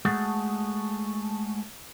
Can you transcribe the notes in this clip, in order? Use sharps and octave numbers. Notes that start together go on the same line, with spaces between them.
G#3 A3 F#4 G#4 A4